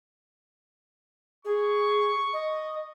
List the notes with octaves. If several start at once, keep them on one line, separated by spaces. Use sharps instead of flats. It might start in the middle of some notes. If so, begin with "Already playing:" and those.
G#4 C#6
D#5